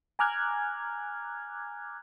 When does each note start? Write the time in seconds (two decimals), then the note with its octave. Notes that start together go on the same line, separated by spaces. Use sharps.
0.19 G#5 A#5 D6 F6 F#6 G#6